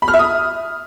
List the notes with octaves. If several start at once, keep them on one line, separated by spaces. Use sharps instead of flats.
B5
F6
E5
D#6